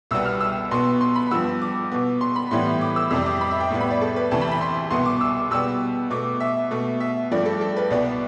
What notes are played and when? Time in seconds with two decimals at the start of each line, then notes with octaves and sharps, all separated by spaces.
0.11 C2 B2 G3 B3 E6
0.26 F6
0.41 E6
0.71 B2 B3 C6
1.01 C6
1.16 B5
1.31 G2 F3 B3 E6
1.62 D6
1.92 B2 B3
2.21 C6
2.36 B5
2.51 A2 E3 G3 B3 C6
2.81 D6
2.96 E6
3.10 F2 C3 G3 E6
3.26 D6
3.41 B5
3.51 E5
3.60 G5
3.71 A2 G3 B3
3.80 B5
3.90 D5
4.01 A4
4.16 B4
4.31 D2 C3 E3 A5
4.41 B5
4.52 B5
4.61 C6
4.91 C2 B2 B3 C6
5.06 D6
5.21 E6
5.51 B2 G3 B3 E6
6.10 B2 A3 D6
6.40 E5
6.71 B2 A3
7.00 E5
7.31 G2 F3 A3 D5
7.46 A4
7.61 A4
7.77 B4
7.91 C2 B2 B3 D5